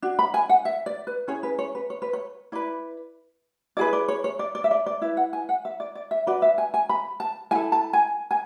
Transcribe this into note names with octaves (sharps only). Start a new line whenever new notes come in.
D4 F#4
B5
G#5
F#5
E5
D5
B4
C#4 E4 G#4 C#5
B4
C#5
B4
C#5
B4
C#5
E4 B4 D5
E4 G#4 B4 D5
D5
C#5
C#5
D5
D5
E5
D5
D5
E4 B4 E5
F#5
G#5
F#5
E5
D5
D5
E5
D4 F#4 B4 D5
E5
G#5
G#5
B5
A5
E4 A4 G#5
A5
G#5
G#5